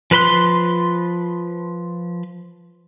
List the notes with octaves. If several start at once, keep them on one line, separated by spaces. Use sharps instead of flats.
F3 B4 B5 C6 F#6